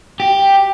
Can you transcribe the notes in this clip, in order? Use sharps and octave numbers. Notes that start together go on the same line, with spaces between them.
G4